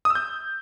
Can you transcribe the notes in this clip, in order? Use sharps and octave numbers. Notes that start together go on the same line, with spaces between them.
D#6
E6
G6